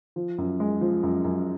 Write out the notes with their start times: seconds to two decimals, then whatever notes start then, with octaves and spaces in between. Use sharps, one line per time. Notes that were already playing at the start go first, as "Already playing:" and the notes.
0.16 F3
0.38 F#2
0.60 G#3
0.81 F3
1.03 F#2
1.24 F#2